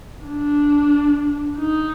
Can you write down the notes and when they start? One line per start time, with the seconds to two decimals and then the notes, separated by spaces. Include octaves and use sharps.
0.25 D4
1.58 D#4